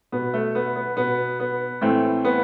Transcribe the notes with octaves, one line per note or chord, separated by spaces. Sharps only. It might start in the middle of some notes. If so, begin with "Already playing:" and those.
B2 B3
A3
B3
B3
B2 B3
B3
A2 E3 A3 C4
B3